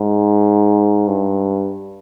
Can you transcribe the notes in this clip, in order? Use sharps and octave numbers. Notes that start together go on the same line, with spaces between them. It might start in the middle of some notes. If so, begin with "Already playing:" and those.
Already playing: G#2
G2